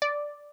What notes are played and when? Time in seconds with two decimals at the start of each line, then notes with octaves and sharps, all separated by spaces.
0.02 D5